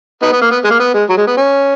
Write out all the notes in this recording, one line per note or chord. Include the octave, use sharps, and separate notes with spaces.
B3 D#4
B3
A#3
B3
G#3
A#3
B3
G#3
F#3
G#3
B3
C#4